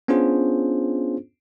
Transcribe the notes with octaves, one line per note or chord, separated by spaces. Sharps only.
B3 C#4 D4 F4 G#4 C5